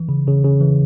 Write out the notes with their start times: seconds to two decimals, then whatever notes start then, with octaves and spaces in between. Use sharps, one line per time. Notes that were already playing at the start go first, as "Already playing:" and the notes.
Already playing: E3
0.09 C#3
0.27 C#3
0.44 C#3
0.61 E3